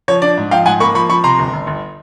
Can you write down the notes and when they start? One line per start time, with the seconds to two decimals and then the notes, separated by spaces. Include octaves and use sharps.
0.08 F3 C#5
0.22 D4 D5
0.38 G#2
0.51 F3 F5 G5
0.66 G#2 F#5 G#5
0.80 A#3 B5 C#6
0.95 F3 B5 C#6
1.09 F3 B5 C#6
1.24 C3 A#5 C6
1.39 G1
1.53 G1
1.67 G1